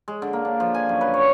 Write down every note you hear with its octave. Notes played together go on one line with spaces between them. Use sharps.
G#3
D3
A#3
D4
F3
G#5
F#2
B4
C#5